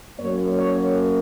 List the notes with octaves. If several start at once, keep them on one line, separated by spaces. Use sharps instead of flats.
F#2 F#3 A#3 C#5
C#5